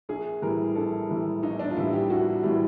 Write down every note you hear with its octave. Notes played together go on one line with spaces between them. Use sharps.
A#1 G#4
A2 E3 G3 A#4
A#1 A4
A2 E3 G3
A#1 D#4
D4
F4
A2 E3 G3 E4
G4
A#1 F#4
A2 E3 G3